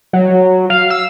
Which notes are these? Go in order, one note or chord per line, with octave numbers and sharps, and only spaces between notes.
F#3
F5
E6